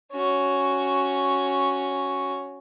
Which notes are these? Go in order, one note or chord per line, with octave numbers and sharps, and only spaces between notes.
C#4 F#4